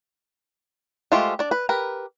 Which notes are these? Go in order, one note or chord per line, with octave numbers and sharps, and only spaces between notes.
G#3 A3 F4 G4 C5
D4 D5
B4
G4 A#4 B4